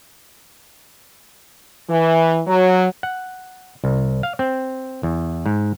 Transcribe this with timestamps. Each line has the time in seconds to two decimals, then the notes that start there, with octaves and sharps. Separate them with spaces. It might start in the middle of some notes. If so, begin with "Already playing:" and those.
1.90 E3
2.47 F#3
3.03 F#5
3.84 C2
4.23 F5
4.39 C4
5.03 E2
5.46 G#2